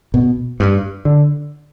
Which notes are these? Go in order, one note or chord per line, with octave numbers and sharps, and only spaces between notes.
B2
G2
D3